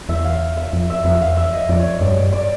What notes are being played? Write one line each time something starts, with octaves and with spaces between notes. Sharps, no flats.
E2 E5
F5
E5
F2
E5
F2 E5
E2 F5
F2 E5
D#5
F2 D5
C#5
G2 D5
G2
D5